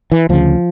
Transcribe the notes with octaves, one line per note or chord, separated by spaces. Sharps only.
E3
D2 C#3 F3